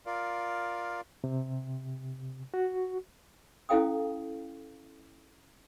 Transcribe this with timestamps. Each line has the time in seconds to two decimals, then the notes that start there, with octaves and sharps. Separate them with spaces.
0.06 F4 A#4 D5 F5
1.24 C3
2.54 F#4
3.69 C#4 E4 A4 F5 G5 D#6